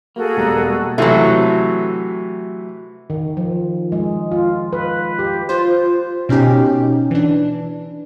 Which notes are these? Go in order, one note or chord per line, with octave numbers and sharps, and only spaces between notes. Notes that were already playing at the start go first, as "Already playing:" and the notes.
A#3 F#4 G#4 A4
E1 G3 A#5
C3 E3 F#3 A3
D#3
F3
G#3
F4
B4
G4
F4 C5
B2 C#4 D#4 G4
E3 D4